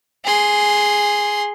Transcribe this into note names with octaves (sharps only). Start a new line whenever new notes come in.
G#4 C6